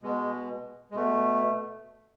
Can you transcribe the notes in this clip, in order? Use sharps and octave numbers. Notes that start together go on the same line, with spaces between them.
B2 G#3
G#3
B2 A3